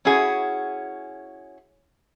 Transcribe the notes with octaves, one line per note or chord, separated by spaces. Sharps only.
C#4 E4 F#4 G#4